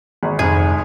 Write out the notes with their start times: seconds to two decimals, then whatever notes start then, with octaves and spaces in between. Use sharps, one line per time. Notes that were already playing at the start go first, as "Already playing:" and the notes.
0.23 G#1 G#4
0.39 C2 F2 G#2 G#4